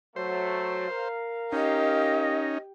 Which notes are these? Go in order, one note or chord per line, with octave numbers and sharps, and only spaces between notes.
F#3 A3 C5
A#4 F5
C#4 D#4 G4 D#5